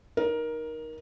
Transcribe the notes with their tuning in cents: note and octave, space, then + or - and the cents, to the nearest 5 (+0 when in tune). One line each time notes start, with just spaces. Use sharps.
D#4 +0 A#4 +15